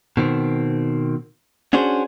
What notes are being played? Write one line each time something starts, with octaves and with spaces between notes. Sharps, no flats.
B2 D#3 C4
C#4 D4 F#4 G#4 C5